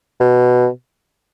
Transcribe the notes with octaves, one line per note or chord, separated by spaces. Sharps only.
B2